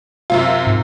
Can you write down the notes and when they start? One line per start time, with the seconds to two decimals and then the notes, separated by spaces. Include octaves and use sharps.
0.30 F#2 C3 F4
0.67 G#2